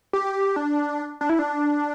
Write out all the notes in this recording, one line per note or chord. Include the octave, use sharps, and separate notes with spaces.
G4
D4
D4
E4
D4